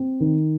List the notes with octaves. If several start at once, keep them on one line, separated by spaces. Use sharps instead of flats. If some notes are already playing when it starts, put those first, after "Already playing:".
Already playing: C4
D#3